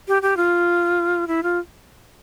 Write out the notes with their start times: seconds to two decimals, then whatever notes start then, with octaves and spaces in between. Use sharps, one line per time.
0.08 G4
0.22 G4
0.37 F4
1.28 E4
1.43 F4